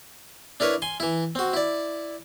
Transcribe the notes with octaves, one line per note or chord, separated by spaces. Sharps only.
D4 E4 A#4 B4 C#5
G#5 C6
E3 E4
C4 F#4
E4 D5